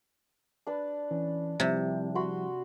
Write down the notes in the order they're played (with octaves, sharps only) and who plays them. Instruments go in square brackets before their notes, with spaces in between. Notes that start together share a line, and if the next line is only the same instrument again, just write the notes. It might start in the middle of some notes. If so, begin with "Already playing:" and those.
[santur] D4 B4 A5
[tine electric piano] E3 C#4
[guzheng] C3 [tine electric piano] F3 G3 E4
[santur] F#4 B5 C6